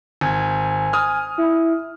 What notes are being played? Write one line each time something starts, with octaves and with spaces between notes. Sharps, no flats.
G#1 G#5
D#6 F6
E4